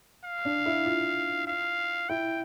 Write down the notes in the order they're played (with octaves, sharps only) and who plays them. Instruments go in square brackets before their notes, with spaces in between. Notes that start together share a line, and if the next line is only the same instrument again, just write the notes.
[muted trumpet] F5
[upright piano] D4
E4
F4
[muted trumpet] F5
[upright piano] E4 [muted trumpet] G5